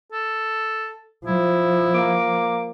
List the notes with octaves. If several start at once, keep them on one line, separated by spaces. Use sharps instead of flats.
A4
F3 E4
A#3 D6